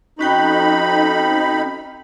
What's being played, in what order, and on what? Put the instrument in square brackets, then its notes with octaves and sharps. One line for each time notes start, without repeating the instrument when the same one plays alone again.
[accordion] F2 D#4 B5 [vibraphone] C#4 F#4 G5